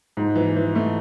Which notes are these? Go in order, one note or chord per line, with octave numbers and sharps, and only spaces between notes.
G#2
E3
E3
A3